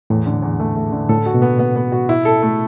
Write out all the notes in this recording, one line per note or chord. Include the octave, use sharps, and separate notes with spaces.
E2 A2
D3
E2
A3
A3
D3
A2 A4
F#4
B2
B3
B3
B3
F#4
E4
A4
A3